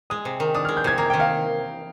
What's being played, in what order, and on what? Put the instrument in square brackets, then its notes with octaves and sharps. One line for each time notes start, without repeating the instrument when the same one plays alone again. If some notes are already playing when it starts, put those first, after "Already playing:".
[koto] G#3 [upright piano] D#6
[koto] C3
D#3
[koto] D4 [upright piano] D#6
[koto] G#3 [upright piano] F6
[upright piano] G6
[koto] C3 [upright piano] G#6
[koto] A#3 [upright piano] A#5
[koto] D#3 [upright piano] G5
[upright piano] F5